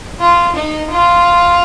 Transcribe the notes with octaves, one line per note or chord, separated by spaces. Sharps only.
F4
D#4
F4